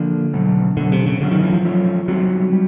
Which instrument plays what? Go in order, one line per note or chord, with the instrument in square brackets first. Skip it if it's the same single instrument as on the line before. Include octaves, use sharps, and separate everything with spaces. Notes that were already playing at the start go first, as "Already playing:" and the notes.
Already playing: [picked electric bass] D3 [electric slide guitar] F3 A#3
[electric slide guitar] B2 F#3 A3
[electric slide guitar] B2 F#3 A3 [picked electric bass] D3
[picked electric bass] C3
C#3
[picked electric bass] D3 [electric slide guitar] F#3 A3 C#4 F4
[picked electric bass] D#3
E3
F3
[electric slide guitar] F#3 A3 C#4 F4
[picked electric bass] F#3 [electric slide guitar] G3 C4 D#4 F#4
[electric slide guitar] G3